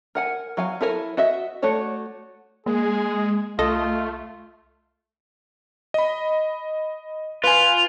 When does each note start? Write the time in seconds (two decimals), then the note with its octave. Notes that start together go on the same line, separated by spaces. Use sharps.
0.15 A#4 F#5 G#5
0.57 F#3 F5 G#5
0.81 E4 A4 A#4 C#5 G#5
1.17 F#4 D#5 E5
1.62 A3 F#4 C#5 D5
2.66 G#3 A#3 G#4
3.59 C2 A3 F4 A4 D#5
5.94 D#5 B5
7.44 F4 B4 G#5